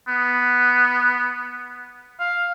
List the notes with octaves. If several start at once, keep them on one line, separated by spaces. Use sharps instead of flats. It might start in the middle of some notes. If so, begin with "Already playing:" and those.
B3
F5